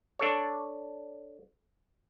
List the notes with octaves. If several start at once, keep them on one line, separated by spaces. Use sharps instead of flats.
D4 A4 C#5